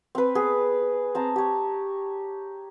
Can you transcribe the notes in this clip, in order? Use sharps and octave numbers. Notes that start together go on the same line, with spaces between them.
C4 B4
B3 G#4
C4 A5 A#5
G4 C#5